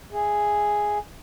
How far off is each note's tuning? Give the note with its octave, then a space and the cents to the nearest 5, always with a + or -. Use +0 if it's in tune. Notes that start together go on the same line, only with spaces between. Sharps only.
G#4 +0 E5 +0